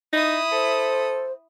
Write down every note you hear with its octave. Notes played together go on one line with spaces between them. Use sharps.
D#4 E4 D#6
A4 C5